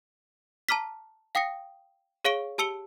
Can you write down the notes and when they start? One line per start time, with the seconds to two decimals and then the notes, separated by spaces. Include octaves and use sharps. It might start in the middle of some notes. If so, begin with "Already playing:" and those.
0.69 A5 A#5 D6 F6 B6
1.35 F5 G5 D#6 A#6 C#7
2.25 G#4 C#5 F5 C#6 D7 G7
2.58 G4 A5 E6 C#7 F7 G7